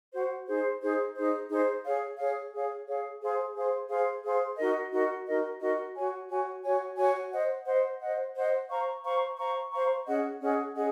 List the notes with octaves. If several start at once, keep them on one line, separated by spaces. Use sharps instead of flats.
F#4 C5 F#5
D#4 G#4 C5
D#4 G#4 C5
D#4 G#4 C5
D#4 G#4 C5
G#4 C#5 F5
G#4 C#5 F5
G#4 C#5 F5
G#4 C#5 F5
G#4 C5 F5 C6
G#4 C5 F5 C6
G#4 C5 F5 C6
G#4 C5 F5 C6
D#4 F#4 A#4 D#5
D#4 F#4 A#4 D#5
D#4 F#4 A#4 D#5
D#4 F#4 A#4 D#5
F#4 C#5 G#5
F#4 C#5 G#5
F#4 C#5 G#5
F#4 C#5 G#5
C5 D#5 F#5
C5 D#5 F#5
C5 D#5 F#5
C5 D#5 F#5
C5 F5 A#5 C#6
C5 F5 A#5 C#6
C5 F5 A#5 C#6
C5 F5 A#5 C#6
C#4 G#4 D#5 F#5
C#4 G#4 D#5 F#5
C#4 G#4 D#5 F#5